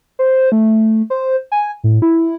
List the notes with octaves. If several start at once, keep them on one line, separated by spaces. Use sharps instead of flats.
C5
A3
C5
G#5
A2
E4